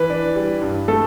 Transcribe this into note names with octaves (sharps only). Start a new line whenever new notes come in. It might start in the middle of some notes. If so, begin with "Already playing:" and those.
Already playing: E3 B4
D4
G3
G2
A3 A4